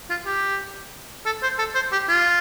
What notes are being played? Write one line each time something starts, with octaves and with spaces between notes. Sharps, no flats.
F4
G4
A4
C5
A4
C5
G4
F4